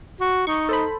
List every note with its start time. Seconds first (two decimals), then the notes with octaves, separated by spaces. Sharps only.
0.20 F#4
0.47 D#4 C#6
0.69 A4 C5 B5